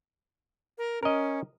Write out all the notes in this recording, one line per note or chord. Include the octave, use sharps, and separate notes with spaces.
A#4
C#4 A#4 D#5